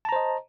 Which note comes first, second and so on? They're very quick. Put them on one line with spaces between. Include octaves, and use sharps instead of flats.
A5 A#5 C5 D#5